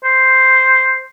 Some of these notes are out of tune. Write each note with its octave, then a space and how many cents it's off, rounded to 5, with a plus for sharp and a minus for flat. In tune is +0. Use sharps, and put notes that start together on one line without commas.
C5 +0